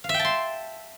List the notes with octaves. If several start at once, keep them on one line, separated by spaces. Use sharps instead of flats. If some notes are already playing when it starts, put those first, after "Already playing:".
F5
E5
G5
A5
C6